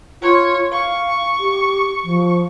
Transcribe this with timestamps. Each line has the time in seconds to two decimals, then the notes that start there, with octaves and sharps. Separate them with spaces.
0.22 F4 C#5
0.72 F5 C#6
1.40 G4
2.04 F3